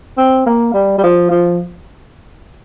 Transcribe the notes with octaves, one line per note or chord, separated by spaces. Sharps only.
C4
A#3
G3
G3
F3
F3